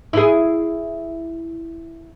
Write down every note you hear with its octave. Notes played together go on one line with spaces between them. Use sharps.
E4 G#4